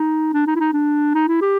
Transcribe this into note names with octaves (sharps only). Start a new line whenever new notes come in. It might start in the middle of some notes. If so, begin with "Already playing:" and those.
Already playing: D#4
D4
D#4
E4
D#4
D4
D#4
E4
G4